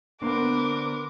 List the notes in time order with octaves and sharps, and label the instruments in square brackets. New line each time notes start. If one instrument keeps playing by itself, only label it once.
[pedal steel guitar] D3 D4 C5 [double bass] B3 [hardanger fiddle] A#4 [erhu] D6